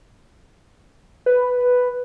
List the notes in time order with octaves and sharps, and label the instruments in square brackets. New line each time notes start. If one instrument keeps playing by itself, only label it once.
[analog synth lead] B4